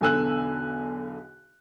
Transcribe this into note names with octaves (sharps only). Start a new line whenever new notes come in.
B1 E2 D3 G#5 E6 F#6